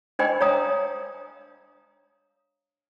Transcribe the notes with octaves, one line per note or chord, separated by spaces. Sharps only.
D4 C5 D#5 G5 G#5 B5
C#5 F5 A#5 D#6